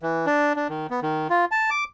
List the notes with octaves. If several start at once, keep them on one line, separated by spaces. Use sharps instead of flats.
E3
D4
D4
D#3
B3
D#3
F4
A5
D6